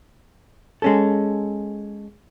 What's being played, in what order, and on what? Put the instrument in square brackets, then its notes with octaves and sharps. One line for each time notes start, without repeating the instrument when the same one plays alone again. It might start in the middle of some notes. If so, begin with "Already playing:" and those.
[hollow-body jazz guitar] G#3 C#4 A4